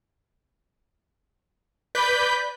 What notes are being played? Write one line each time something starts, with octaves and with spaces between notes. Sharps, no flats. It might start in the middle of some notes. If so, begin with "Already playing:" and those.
B4 D5 G6 B6